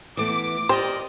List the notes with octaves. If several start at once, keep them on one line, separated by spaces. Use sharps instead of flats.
E3 A3 B3 D6
C4 G4 A#4 C5 D5 D#5